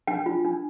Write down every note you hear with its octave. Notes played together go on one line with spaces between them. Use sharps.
D4 G5
F4
D4